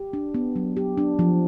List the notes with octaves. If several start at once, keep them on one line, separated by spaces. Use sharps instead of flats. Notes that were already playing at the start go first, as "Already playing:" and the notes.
Already playing: G4
D4
B3
F#3
G4
D4
F3